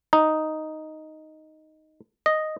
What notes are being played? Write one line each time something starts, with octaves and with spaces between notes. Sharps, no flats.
D#4
D#5